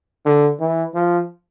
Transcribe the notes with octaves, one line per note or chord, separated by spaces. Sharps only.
D3
E3
F3